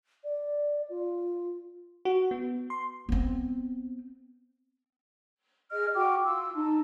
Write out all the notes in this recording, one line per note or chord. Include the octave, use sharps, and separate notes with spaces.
D5
F4
F#4
B3
C6
B3 C4
G#4 D#5 F6
F#4 G5 D6
F4 E6
D#4 A5